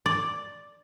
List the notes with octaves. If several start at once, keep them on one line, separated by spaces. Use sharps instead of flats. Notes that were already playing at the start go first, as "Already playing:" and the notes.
D5